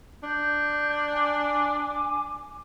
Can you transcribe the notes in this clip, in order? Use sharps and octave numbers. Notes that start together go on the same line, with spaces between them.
D4 G6
G#5 D6